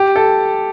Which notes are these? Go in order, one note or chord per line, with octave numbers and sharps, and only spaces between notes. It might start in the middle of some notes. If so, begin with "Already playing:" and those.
Already playing: G4
A4